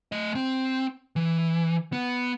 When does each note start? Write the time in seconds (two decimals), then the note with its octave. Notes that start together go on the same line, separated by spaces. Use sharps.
0.12 A3 D#5
0.35 C4
1.16 E3
1.93 B3